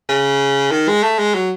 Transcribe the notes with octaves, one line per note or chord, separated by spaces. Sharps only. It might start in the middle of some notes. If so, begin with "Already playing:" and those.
C#3
D#3
G#3
A3
G#3
F#3